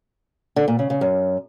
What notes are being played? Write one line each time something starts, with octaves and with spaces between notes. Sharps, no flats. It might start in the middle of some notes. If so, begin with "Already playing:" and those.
D3
A#2
C#3
C#3
F#2